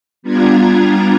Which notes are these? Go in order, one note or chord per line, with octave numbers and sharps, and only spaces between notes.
G3 B3 D4 F4 A#5 G#6